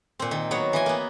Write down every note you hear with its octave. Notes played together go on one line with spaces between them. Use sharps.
A#2 C4
D#3
F#3 B3 C#5
E3 D#5 G#5
A#3 B3